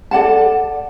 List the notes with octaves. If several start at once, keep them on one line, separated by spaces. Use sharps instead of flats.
A4 D5 F#5 A5